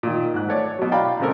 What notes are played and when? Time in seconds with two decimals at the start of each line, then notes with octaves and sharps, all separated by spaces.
0.03 A#2 D#3
0.34 G#2 F#6
0.48 A3 C#5 D5
0.79 B2 F#3
0.92 E4 D5 F5 G5 A#5 B5
1.20 A#2 C#3 G#3 C4 A4 A#4